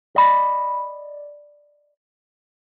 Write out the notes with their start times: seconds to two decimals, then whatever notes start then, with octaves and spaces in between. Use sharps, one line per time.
0.16 D5 D#5 B5